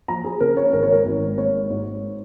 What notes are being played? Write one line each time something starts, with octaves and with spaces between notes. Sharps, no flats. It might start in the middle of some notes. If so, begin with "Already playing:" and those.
F3 A#5
G#4
C#3 A#4
C#5
G#1 A#4
C#5
A#4
G#1
G#3 C#5
G#2